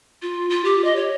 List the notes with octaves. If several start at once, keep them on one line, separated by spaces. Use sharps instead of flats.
F4
F4
G4
D#5
C#5